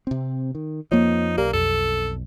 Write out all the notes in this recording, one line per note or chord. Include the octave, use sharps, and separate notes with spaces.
C3 C4
D#3
F2 F3 A#3 D#4 C#5
B1 A#3 G4 D5 A#5
F2 A4